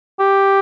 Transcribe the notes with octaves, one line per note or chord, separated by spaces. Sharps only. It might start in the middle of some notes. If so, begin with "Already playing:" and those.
G4